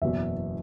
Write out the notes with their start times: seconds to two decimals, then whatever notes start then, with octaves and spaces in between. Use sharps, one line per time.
0.02 F#1 E2 B2 E5